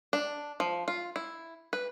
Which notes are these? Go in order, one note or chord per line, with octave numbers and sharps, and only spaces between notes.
D4
F3
F4
E4
B4